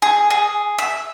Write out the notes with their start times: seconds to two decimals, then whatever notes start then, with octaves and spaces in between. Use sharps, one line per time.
0.02 G#4
0.30 G#4
0.78 E5